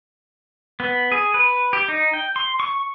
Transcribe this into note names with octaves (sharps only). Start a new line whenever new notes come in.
B3
G#4
B4
G4
D#4
G5
C6
C#6